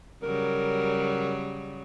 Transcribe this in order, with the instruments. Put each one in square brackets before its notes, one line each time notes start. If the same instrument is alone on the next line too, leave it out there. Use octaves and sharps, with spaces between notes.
[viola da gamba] C#3 F#3 G3 [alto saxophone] A#4